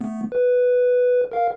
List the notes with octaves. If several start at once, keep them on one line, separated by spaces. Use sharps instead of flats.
A3 B3
B4
A#4 F5